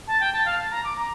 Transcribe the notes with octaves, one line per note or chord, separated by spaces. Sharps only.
A5
G5
A5
F5
A5
A#5
D6
A#5